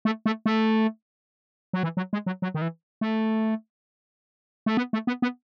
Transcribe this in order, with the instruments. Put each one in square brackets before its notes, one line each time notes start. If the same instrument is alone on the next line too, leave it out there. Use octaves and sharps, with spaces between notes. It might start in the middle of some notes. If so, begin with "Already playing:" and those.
[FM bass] A3
A3
A3
F#3
E3
F#3
G#3
F#3
F#3
D#3
E3
A3
A3
B3
A3
B3
B3